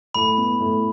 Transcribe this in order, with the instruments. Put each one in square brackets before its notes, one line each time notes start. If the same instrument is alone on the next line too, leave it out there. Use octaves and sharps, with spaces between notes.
[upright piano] A2 [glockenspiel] B5
[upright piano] B3
A2